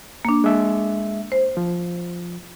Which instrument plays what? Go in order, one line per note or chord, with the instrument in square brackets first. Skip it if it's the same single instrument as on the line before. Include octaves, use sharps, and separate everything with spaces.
[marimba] A#3 D4
[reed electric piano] G#3 E5
[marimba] C5
[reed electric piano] F3